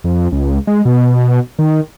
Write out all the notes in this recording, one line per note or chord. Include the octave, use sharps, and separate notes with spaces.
F2
C#2
G#3
B2
D#3